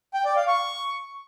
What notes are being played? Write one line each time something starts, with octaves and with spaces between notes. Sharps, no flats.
G5
D5
F5
C#6